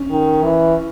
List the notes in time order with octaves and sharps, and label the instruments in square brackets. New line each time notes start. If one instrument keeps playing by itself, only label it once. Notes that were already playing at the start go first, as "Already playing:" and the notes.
Already playing: [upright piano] C#4
[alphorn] D#3
E3